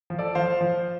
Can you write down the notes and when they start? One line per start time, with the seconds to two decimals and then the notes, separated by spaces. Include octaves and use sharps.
0.10 F3
0.19 A4 D5
0.35 F3 C5 F5
0.61 F3